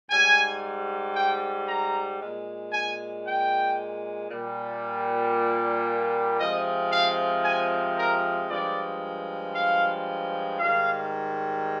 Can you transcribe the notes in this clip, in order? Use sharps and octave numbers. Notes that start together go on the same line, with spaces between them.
G#2 G3 G#5
G5
A#5
A#2 G#3
G#5
G5
A#2 G3
C3 F3 G#3 D#5
F5
G#5
A#4
G2 F3 G#3 D5
F5
G#2 D#3 G3 F5